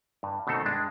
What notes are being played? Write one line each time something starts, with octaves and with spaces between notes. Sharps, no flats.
G2
B2 D#3 A3 C4 A4
G2 G#3 D4